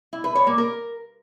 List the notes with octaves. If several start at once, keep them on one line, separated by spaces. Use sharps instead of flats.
E4
B4
C#5
A#3
A#4